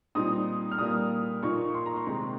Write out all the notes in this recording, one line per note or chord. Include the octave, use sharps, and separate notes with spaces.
A#2 G3 C4 D#4 D#6
F6
A#2 G3 A#3 D#6
A#2 F3 A#3 D#4 C#6
C6
A#5
C6
C3 D#3 G#3 C4 D#4